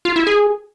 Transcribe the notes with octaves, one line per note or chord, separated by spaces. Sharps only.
F4
E4
G#4